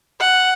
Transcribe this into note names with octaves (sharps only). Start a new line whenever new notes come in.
F#5